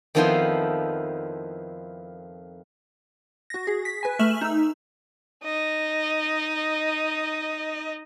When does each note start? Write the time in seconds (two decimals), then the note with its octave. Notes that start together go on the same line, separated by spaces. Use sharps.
0.15 F2 D#3 F3 B3 E4 C6
3.50 F#4 A#6
3.67 G#4
3.85 B6
4.03 B4 G#5
4.19 A3 E5 F6 E7 F#7
4.41 D#4 E6
5.44 D#4 D#5